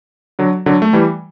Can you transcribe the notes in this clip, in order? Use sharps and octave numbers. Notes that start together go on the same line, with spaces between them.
D3 F#3
D3 F#3
A3
E3 G3